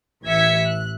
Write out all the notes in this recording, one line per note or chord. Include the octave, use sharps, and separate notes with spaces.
A1 E3 E5 G#6 B6 C#7
F#6